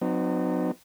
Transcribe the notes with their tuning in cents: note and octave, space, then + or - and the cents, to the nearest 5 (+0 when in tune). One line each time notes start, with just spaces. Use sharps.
F#3 -25 B3 +45 D#4 -35